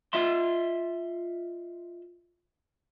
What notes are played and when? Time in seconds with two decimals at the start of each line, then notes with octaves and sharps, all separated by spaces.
0.13 F4 D#5 E5 C6